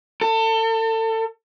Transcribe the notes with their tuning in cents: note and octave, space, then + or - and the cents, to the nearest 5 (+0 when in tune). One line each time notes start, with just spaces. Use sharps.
A4 +30